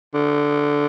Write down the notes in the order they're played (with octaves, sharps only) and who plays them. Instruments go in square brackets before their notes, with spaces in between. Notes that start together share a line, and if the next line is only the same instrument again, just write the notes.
[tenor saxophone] D3